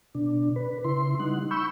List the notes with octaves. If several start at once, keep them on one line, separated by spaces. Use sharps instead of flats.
B2 D4
B4
C#3 E4 C6
G3 D#4 F#5
B5 C#6 E6 G6